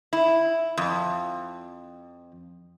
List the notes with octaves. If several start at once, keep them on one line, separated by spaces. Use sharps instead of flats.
E4
F2